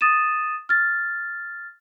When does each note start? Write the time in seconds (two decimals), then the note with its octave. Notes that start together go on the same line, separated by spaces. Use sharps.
0.01 D#6 A6 D#7 E7
0.69 F6 A6